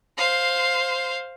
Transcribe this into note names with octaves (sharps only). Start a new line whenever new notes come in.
C5 F5